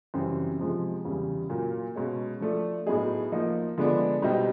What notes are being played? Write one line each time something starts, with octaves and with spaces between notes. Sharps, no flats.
F#2 C#3 E3 G3 C4
F2 C3 F3 G#3
E2 C#3 E3 G3
A#2 F#3 A#3
B2 G#3 C#4
F3 A3 D4
A2 F#3 B3 D#4 G#4
F3 A#3 D#4
D3 F3 G#3 B3 D4
B2 G3 C4 D#4 G4